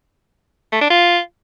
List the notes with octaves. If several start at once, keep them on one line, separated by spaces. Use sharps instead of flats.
A3
D4
F4